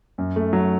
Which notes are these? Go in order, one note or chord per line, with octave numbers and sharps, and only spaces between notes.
F#2
A3
F#3